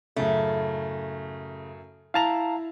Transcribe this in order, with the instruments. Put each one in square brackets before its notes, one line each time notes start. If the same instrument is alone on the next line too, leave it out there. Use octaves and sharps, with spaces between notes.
[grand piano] F#2 A2 [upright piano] C#3 [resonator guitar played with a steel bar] A3
[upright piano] E4 F7 [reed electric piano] F5 A5 A#5